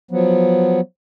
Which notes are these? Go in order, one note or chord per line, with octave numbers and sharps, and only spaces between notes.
F3 F#3 B3